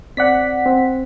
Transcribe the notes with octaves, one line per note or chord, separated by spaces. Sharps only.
C4 D5 F#5 B6
C4